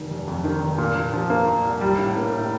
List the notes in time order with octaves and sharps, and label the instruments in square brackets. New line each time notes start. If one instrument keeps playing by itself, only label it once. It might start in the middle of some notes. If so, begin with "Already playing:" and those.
Already playing: [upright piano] F1 D#3
F1
F2
D#3
F1
A#2
A#2
F3
A#3
A#2
C2
G3
A2
A#3
A2